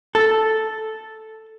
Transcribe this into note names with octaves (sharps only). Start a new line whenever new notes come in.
A4